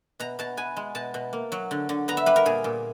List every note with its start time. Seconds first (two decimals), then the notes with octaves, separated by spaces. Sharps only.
0.20 B2 A#5
0.39 B2 A5
0.57 B3 G#5
0.76 G#3
0.95 B2 A5
1.14 B2
1.33 A#3
1.52 F#3
1.71 D3
1.89 D3
2.08 B3 A#5
2.17 E5
2.26 G3 B4
2.36 A#4
2.46 A#2 G#4
2.64 A#2